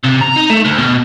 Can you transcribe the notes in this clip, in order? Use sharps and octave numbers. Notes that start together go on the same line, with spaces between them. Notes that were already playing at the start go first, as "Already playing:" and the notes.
C3
A#5
D#4
A3
D2
B2